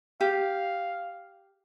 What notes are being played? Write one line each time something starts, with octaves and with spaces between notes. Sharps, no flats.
G4 F5